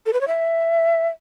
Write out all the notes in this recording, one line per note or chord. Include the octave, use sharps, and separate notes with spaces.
A4
B4
C#5
E5